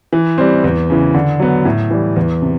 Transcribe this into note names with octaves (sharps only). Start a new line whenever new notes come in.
E3
G3 C4
E2
C#3 E3
D3
F#3 B3
A2
E3 G3
E2
C3